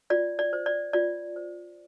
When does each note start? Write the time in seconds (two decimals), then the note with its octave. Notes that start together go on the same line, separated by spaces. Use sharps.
0.10 F4 D5
0.39 D5
0.53 C5
0.66 D5
0.93 F4 D5
1.36 C5